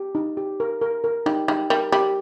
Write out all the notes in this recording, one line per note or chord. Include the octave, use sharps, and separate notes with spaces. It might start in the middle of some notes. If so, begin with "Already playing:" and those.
Already playing: G4
D#4
G4
A#4
A#4
A#4
G3 D#4
G3 D#4
G3 A#4
G3 G4